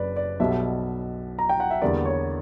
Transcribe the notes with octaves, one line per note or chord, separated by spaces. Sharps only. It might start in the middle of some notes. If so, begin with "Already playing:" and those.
Already playing: F#1 F#2 B4 D5
D5
B1 B2 G3 E5
A#5
G5
F#5
E5
E2 D3 G3 A#3 D5
C#5